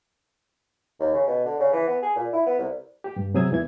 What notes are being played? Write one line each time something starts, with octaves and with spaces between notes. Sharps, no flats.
D#2
C#3
B2
D3
C#3
E3
B3
G#4
A#2
E4
B3
C2
G4
G2
C3 F#3 G#4 D#6 E6 G#6
E2 E3 G#6